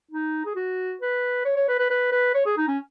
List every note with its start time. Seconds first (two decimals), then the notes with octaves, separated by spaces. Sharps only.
0.11 D#4
0.46 G#4
0.56 F#4
1.01 B4
1.45 C#5
1.56 C#5
1.68 B4
1.79 B4
1.90 B4
2.12 B4
2.34 C#5
2.46 G#4
2.57 D#4
2.68 C#4